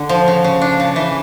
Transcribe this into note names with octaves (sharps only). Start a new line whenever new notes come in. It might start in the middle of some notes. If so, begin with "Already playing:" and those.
Already playing: D3
F3
C#3
C#3
D4
C#3
E3